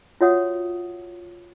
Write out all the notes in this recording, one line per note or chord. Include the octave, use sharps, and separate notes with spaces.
F4 F#4 C#5 E5 F#5 D#6